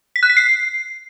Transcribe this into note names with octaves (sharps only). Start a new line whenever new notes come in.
B6
F#6
B6
C7